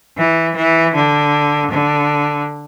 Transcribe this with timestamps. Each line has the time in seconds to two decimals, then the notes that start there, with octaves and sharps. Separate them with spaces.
0.18 E3
0.56 E3
0.95 D3
1.71 D3